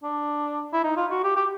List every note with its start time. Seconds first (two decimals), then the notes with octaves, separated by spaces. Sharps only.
0.03 D4
0.74 E4
0.84 D#4
0.97 F4
1.11 F#4
1.24 G4
1.36 G4